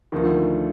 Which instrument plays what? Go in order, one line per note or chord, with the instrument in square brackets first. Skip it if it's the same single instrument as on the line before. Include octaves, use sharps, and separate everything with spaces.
[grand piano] D2 D3 F3 A3 [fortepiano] D#3